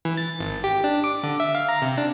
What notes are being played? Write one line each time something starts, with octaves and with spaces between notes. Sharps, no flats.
E3
A6
G#1
G4
D4
D6
D3
E5
F5
A#5
C3
D4